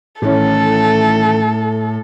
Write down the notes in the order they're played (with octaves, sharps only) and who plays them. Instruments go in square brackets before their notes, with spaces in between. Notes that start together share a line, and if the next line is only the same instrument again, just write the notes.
[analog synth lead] A2 [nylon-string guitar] D#3 E3 C#4 [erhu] A4